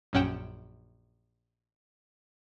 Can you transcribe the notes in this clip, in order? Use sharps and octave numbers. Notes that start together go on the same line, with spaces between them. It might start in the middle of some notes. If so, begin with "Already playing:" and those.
A#1 F#2 C#4 F#5 G5 E7